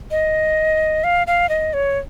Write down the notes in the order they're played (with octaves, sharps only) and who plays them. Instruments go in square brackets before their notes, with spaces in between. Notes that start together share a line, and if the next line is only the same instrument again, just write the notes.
[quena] D#5
F5
F5
D#5
C#5